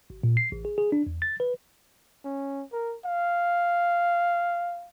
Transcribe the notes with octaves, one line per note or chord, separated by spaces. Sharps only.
G#1
A#2
C7
A1
G#4
G#4
D4
E2
A6
B4
C#4
A#4
F5